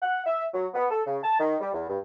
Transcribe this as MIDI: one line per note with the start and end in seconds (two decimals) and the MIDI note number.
0.02 0.20 78
0.26 0.45 76
0.53 0.67 54
0.74 0.85 59
0.90 1.01 69
1.07 1.18 49
1.23 1.40 81
1.40 1.56 51
1.61 1.69 55
1.74 1.88 40
1.89 1.97 43